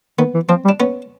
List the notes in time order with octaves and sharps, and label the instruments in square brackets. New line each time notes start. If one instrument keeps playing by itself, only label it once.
[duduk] D#3 [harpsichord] B3
[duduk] E3
[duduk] F3 [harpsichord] C4
[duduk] G3
[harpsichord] D4
B3 C#4